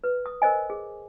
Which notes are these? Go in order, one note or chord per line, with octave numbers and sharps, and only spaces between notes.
B4
D#6
A#4 C5 D#5 G#5
G#4